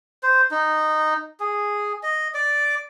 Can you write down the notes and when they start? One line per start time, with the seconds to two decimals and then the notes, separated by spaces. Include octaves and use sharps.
0.23 C5
0.51 D#4
1.40 G#4
2.03 D#5
2.34 D5